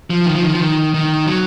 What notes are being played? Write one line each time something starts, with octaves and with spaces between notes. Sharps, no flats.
F3
D#3
F3
D#3
F3
D#3
D#3
F#3